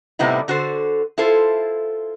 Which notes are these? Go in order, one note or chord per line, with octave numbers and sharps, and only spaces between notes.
A2 C3 G3 B3 D#4 E4
D3 F#4 A4 C5
E4 F4 A4 C5